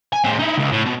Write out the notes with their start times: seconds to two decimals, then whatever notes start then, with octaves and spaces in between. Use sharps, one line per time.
0.13 G#5
0.24 A2 C4
0.39 D#4 E4
0.58 C#2
0.72 A2
0.86 B2